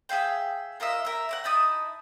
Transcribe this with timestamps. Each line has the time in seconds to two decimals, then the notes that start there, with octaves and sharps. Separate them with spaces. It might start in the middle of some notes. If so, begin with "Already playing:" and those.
0.09 G#4 E5 F5 G5
0.80 F4 A#4 D#5 E5
1.05 A#4 E5
1.29 A#4 D5 F#5
1.44 D#4 E4 A5 D#6